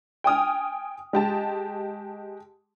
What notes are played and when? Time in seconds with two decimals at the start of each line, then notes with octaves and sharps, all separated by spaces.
0.24 G5 G#5 D#6 F6
1.13 G#3 G4 A5